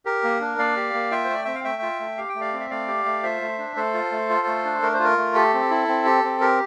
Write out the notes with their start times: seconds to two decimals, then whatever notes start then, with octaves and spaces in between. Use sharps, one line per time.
0.05 G4 A#4
0.24 A#3
0.41 D4
0.58 A#3 D5 F5
0.77 G4
0.94 A#3
1.11 F4 E5 G5
1.24 C5
1.30 A3 D5
1.45 C4 E5
1.55 F5
1.64 A3 E5 G5
1.82 F4
2.00 A3
2.17 G4 F5
2.29 G5
2.35 A3
2.40 D5 F5
2.53 C4
2.60 E5
2.70 A3 D5 F5
2.88 G4
3.05 A3
3.23 F4 C5 E5
3.41 A3
3.58 D4
3.76 A3 A4 C5
3.94 F4
4.12 A3
4.30 F4
4.47 A3
4.65 D4
4.82 A3 A#4
4.94 C5
5.00 F4 A#4
5.18 A3
5.35 G4 A4
5.54 C4
5.70 E4
5.88 C4
6.06 G4
6.24 C4
6.41 G4 A#4